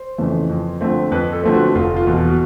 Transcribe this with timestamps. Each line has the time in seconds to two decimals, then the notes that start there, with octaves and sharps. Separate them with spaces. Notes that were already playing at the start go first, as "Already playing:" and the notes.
Already playing: C5
0.18 F2 C#3 E3 A3
0.49 F2
0.81 D3 F3 A3 C4
1.12 F2 B4
1.33 A4
1.44 D3 F3 A3 C4
1.54 F#4
1.75 F1 F4
1.96 F4
2.07 E2 B2
2.29 F#4